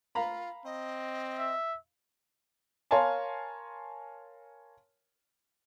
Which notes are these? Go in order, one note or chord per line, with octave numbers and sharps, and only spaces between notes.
F4 F5 A#5 B5
C4 D#5
E5
A#4 C#5 F5 G#5 A5 C6